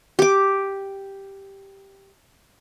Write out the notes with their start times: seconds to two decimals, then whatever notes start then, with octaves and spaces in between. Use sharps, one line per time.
0.19 G4 D6